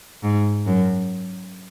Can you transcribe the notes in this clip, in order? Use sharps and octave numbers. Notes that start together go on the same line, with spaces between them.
G#2
F#2